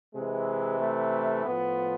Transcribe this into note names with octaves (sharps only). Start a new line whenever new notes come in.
C3 E3 G#3
A3
A2 F3 B3